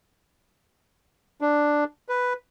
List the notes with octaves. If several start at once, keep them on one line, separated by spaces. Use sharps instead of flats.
D4
B4